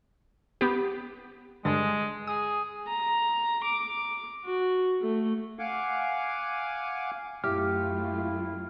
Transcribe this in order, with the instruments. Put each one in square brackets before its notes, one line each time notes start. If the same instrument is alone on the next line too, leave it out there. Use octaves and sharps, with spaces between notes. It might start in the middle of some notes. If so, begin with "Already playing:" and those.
[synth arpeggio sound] B3 G4
[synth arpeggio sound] G2 D3 A6 [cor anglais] G#3
[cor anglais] G#4 [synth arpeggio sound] D#6
[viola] A#5
D6
F#4
A3
[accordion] F5 F#5 G#5 D6
[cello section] F#2 A3 F4 [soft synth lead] E4 [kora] G4 [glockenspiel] F6